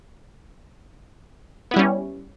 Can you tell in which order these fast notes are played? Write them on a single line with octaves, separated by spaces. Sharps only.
B3 E4 G3 C#4